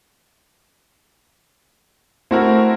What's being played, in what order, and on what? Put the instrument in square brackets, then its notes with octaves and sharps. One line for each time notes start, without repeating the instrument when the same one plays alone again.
[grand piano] A3 C4 [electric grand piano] E4 F#4 A#4